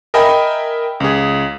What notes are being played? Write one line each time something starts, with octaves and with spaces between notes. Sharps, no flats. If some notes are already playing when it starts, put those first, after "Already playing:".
A#4 D#5 E5 G5 G#5 B5
C#2 G#4